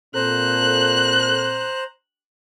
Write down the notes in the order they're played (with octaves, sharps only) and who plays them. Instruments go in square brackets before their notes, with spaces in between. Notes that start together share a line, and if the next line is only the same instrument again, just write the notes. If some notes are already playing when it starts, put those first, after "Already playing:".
[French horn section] A#2 C4 A4 [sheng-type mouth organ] C5 A#5 [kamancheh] F#6